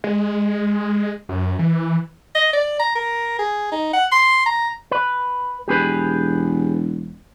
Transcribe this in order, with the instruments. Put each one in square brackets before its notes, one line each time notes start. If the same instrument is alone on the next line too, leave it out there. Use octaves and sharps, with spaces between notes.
[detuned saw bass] G#3
F#2
E3
[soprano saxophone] D#5
D5
A#5
A#4
G#4
D#4
F#5
C6
A#5
[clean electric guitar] B4
[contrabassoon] E1 [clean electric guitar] G4 G#4 B4